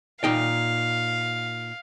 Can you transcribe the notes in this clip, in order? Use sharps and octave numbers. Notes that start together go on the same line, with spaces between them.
A#2 D#4 F5 G5